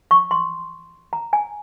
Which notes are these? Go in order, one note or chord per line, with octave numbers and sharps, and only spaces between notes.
C#6
C6
A#5
G#5